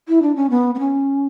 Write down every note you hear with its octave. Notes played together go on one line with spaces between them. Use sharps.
E4
D4
C#4
B3
B3
C#4